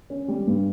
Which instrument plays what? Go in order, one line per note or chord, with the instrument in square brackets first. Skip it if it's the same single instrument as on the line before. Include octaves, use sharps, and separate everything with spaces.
[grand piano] C#4
G3
G2